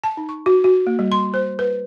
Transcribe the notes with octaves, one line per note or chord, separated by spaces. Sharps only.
A5
D#4
C#6
F#4
F#4
A#3
G3
C6
C5
B4